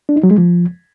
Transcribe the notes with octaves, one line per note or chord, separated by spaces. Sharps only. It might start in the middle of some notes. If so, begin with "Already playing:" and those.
D4
D#4
F#3
G#3
F3